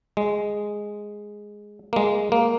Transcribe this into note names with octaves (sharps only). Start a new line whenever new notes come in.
G#3
A#3
G#3
A#3